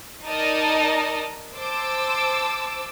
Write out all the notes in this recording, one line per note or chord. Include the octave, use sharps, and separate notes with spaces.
D#4 A#4 D5 D#5 A5
C5 A5 D6 E6